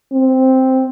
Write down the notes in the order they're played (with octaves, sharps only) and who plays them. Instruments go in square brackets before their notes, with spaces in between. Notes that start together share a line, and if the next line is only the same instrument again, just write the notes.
[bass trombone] C4